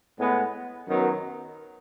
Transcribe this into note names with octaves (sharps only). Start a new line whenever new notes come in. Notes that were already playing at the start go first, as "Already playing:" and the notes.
A2 G#3 B3
F#2 D#3 F#3 B3